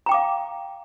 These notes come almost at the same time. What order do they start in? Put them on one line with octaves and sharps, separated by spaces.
A#5 G5 D6 F5